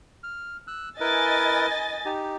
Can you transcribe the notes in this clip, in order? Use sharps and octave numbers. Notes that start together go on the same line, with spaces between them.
F6
E6 F#6
E4 A#4 B4 D#5 G#5 A6
D#4 G4